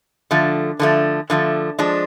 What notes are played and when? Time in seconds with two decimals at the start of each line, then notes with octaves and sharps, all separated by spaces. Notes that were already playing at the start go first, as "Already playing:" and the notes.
0.31 D3 F3 A3
0.80 D3 F3 A3
1.30 D3 F3 A3
1.79 F3 G#3 D4